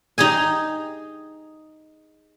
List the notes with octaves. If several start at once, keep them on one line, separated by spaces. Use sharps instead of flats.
D#4 G4 G#4 G#5